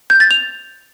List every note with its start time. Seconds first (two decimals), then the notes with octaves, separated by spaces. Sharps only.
0.10 G6
0.20 A6
0.31 F7